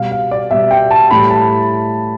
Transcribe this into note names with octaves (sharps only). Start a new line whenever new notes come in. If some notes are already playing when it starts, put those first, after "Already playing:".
Already playing: B2 G3 F5
F5
D5
B2 G3 E5
G5
A5
A2 E3 G3 B5
A5